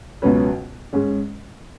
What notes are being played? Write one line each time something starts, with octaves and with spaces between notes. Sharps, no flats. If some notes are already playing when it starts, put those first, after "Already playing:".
C#2 B2 F#3 C#4 B4
G#2 G#3 C#4